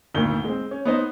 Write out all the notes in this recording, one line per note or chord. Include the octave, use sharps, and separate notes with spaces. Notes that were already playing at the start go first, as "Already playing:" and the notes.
G#1 D2 A#2 G6 G7
G#3 C4
C#4
B3 D#4 C5